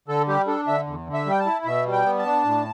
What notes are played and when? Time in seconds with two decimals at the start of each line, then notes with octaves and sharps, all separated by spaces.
0.08 D3 A4
0.28 G3 G4
0.47 D4 A4
0.67 D3 E5
0.87 E2
1.07 D3
1.13 E5
1.26 G3 G5
1.40 A5
1.46 E4
1.65 B2 E5
1.86 G3
1.93 G5
2.05 B3
2.19 A5
2.25 D4
2.45 A2